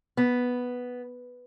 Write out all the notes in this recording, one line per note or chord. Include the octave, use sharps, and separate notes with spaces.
B3